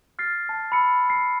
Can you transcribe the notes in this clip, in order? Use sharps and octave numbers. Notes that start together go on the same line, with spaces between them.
F6 A6 C7
A5
B5 E6 C#7
C7